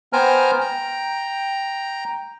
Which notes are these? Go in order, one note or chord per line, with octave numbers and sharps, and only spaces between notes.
B3 C5 G5 G#5 A#5 F6
G5 A#5